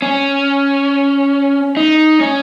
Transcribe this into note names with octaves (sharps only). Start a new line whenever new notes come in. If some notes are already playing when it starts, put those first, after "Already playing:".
C#4
D#4
C#4